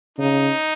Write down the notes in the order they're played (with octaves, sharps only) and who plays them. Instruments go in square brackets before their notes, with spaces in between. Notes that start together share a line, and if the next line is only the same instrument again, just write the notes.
[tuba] C#3 [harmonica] D#4